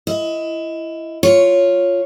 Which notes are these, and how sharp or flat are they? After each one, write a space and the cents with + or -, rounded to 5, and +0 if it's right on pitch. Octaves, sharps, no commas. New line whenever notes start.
E4 +20 D#5 +25
F4 +0 C#5 +0